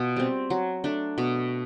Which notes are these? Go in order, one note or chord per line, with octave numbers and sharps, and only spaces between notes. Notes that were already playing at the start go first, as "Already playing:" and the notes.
Already playing: B2 F4
G3 C4
F#3
A3 D4
B2